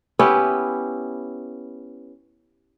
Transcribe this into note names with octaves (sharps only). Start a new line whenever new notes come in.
B3 C#4 E4 G4